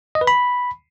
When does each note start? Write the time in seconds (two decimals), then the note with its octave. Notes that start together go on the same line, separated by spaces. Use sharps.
0.15 D#5
0.21 B4
0.27 B5